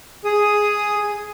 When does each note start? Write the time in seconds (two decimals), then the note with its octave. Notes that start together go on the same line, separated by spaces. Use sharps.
0.25 G#4 D#6